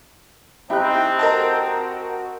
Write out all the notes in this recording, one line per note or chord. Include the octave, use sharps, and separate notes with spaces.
C4 D#4 E4 G4 G5 B5 F#6
F#4 A#4 D#5 A5